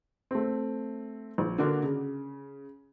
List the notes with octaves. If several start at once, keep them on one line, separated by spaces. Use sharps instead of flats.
A3 C4
A#1
D3 A#3 D4 F#4 A#4
C#3